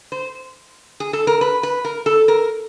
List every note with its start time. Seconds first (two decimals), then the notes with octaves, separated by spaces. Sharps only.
0.12 C5
1.00 G#4
1.13 A4
1.27 A#4
1.41 B4
1.63 B4
1.85 A#4
2.06 A4
2.28 A#4